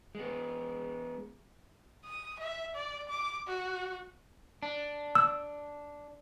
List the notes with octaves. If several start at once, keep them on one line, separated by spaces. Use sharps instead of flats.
G#3 B3
D#6
E5
D5
D6
F#4
D4
E6